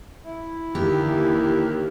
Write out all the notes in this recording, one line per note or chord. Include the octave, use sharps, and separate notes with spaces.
E4
D#2 D3 E3 A#3 G4